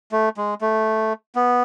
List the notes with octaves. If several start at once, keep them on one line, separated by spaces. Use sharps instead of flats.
A3
G#3
A3
B3